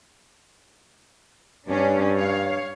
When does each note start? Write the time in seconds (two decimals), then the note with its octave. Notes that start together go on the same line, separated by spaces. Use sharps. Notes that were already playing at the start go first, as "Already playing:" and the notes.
1.68 G2 C#4 D4
2.16 C#5 F5